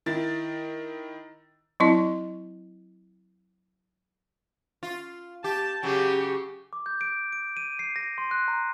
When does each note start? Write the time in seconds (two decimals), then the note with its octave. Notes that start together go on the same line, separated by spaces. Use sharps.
0.06 D#3 E4 A6
1.80 F#3 C4 E4 D#5
4.83 F4
5.44 G4 A5
5.83 C#3 F#3 G4
6.73 D6
6.86 G6
7.01 D7
7.32 D7
7.57 D#7
7.79 C7
7.96 A#6
8.18 C6
8.31 F#6
8.48 A#5